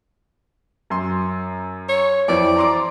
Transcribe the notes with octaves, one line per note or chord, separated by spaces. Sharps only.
F#2 C6
C#5
F2 E3 C4 D5
A#5 C6 D6